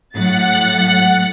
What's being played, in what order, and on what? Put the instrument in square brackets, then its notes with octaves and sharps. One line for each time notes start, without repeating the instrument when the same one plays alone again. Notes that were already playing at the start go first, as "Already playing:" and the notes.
[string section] A2 F#3 A6 [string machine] F#5